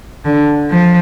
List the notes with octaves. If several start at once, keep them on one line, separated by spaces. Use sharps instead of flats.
D3
F3